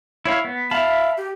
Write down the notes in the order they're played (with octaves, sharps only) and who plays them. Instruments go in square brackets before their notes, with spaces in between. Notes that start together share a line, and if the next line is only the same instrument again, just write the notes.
[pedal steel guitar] E4 C#5 F5
B3
[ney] E5 [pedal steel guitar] F5 A5 B5
[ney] G4